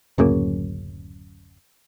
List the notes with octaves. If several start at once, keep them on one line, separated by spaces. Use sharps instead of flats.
D1 F#2 C#3 A#3